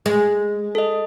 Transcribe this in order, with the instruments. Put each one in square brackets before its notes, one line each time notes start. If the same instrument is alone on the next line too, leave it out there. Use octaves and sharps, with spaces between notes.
[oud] G#3
[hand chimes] A4 D#5